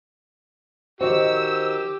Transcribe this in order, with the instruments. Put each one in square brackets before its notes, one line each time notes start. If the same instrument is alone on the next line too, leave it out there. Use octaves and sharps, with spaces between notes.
[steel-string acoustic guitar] D#3 F#4 [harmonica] G4 [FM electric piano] C5 D#5 [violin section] E6